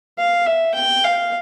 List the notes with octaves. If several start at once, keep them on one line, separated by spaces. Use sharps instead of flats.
F5
E5
G5
F5